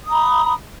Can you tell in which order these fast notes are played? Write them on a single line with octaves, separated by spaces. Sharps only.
D#6 A#5 B5